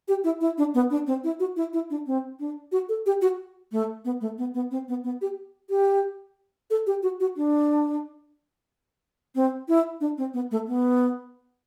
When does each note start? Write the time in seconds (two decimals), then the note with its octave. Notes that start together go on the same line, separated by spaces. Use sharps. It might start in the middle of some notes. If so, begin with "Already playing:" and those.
0.08 G4
0.24 E4
0.41 E4
0.58 D4
0.74 B3
0.90 D4
1.07 C4
1.24 E4
1.40 F#4
1.56 E4
1.73 E4
1.90 D4
2.07 C4
2.40 D4
2.72 F#4
2.89 A4
3.06 G4
3.22 F#4
3.72 A3
4.05 B3
4.21 A3
4.38 B3
4.54 B3
4.71 C4
4.88 B3
5.04 B3
5.21 G4
5.70 G4
6.70 A4
6.87 G4
7.03 F#4
7.20 F#4
7.37 D4
9.35 C4
9.68 E4
10.01 D4
10.18 C4
10.34 B3
10.51 A3
10.67 B3